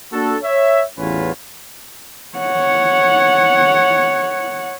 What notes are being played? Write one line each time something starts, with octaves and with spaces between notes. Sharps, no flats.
A#3 D4 F#4 A4
C#5 E5
A1 E2 C#4 F4 B4 C#5
C#5 F#5